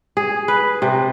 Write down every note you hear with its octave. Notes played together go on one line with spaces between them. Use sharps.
G#4
B4
C3